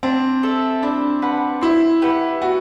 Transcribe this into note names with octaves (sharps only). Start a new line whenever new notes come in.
C4 D4
A4 E5
D4 E4
B4 F#5 A5
C4 E4
G4 B4 F#5
B3 F#4